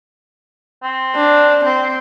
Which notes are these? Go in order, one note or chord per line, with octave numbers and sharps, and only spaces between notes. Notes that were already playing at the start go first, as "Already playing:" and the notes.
C4
D4
C4